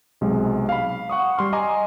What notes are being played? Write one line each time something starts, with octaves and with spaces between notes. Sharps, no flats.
B1 C3 G#3
F5 B5
F#5 C#6 D#6
G3 C6 F6
D#5 G#5 A#5 C6 D6